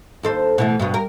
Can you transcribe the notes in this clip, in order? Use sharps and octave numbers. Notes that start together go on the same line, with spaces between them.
D#2 A4 C5
B2 E3 A3
G2 B2 B3
A#4